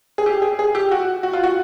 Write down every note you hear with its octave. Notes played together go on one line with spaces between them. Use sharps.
G#4
G4
G#4
G#4
G4
F#4
F#4
F4
F#4